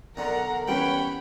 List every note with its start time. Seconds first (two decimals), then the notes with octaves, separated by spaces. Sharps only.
0.17 B1 D3 A#4 F#5 A#5
0.68 E3 G3 B3 C#4 C#5 F#5 G5 B5